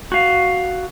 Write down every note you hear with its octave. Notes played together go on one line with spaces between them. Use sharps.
F#4 F5